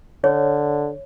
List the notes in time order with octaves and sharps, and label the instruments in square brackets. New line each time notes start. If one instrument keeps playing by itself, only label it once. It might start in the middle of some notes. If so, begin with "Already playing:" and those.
[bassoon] D3 [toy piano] C#5